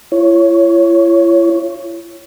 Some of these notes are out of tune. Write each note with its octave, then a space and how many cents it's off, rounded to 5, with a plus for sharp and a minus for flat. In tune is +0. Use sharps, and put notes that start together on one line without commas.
E4 +45 C#5 +0